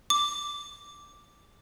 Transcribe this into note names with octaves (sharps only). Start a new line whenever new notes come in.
D6